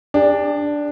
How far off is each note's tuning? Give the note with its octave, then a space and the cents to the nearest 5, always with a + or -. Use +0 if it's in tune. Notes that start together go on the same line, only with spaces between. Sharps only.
D4 +0 G4 +45